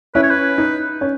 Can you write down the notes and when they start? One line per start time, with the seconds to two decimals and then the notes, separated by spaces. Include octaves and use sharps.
0.15 C#4 E4 B4
0.23 C#5
0.31 B4
0.58 D#4
1.01 C#4